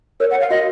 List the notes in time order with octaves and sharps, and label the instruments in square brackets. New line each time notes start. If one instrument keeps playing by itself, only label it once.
[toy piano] A#4 [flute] C#5
[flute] F#5
[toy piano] C#5
[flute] F5
[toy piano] F#4 [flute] D#5